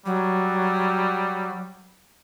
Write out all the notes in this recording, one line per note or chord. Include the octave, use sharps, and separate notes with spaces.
F#3 G3